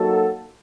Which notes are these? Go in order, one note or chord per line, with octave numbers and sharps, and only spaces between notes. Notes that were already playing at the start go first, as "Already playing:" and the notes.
Already playing: F#3 A#3 D#4 F#4 A4